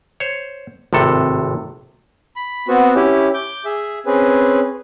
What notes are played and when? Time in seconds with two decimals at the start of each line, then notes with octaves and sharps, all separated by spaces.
0.20 C5 C#5
0.93 G#1 A2 C3 A4
2.36 B5
2.68 B3 C4 F#4
2.95 C#4 E4 G4
3.34 D6 G6
3.65 G#4 E5
4.06 C4 C#4 G#4 B4